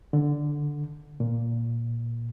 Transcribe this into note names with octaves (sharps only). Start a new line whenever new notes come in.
D3
A#2